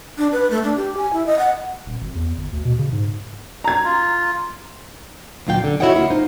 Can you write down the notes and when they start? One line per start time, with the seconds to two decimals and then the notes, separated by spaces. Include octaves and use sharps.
0.18 D4
0.32 B4
0.50 A3
0.64 D4
0.76 G4
0.98 G#5
1.13 E4
1.27 D#5
1.39 F#5
1.86 D#1
2.01 G#1
2.15 E2
2.37 G1
2.53 D2
2.65 B2
2.79 C#3
2.92 G#2
3.64 A#5 G#6
3.85 F4
5.47 D2 A#2 F#3 F4 F5 G5
5.60 F#2 D3
5.80 E4 F#4 C#5 D#5 F#5 G5
5.96 D2 A#3 E4 F4 F#5
6.10 D#4 F4 C5